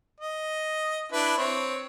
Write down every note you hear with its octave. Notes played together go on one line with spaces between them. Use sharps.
D#5
D4 E4 B4
C4 C#5